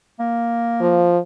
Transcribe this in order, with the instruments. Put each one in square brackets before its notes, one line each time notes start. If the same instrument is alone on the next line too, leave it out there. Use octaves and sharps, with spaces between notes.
[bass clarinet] A#3
[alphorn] F3